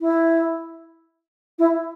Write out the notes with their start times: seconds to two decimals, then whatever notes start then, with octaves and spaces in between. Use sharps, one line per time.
0.01 E4
1.59 E4